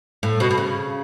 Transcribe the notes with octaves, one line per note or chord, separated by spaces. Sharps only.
A2
B2
B2
C#3